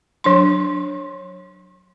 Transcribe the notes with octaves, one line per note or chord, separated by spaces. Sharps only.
F#3 D4 C6